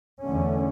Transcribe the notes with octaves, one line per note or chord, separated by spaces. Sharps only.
E2 D3 A3 C#4